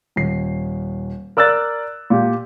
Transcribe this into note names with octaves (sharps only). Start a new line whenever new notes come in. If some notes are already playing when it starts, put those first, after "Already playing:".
D#1 C7
A#4 D5 E6 F#6 A6
A#2 G4